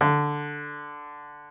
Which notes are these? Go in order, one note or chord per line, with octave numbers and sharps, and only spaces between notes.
D3